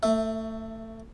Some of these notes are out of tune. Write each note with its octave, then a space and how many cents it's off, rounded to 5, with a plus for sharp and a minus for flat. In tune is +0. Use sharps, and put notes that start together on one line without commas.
A3 +25 E5 +0